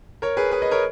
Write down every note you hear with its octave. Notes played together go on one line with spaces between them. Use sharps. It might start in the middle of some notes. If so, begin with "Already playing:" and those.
A#4 C#5
G#4 B4
G#4 B4
B4 D#5
A#4 C#5